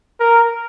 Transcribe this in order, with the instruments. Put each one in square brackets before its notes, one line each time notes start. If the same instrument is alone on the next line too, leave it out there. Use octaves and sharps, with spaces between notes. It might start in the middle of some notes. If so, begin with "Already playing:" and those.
[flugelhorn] A#4